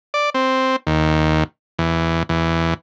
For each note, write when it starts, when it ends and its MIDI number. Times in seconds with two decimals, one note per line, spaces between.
0.14 0.30 74
0.34 0.76 60
0.87 1.43 39
1.79 2.23 40
2.29 2.74 40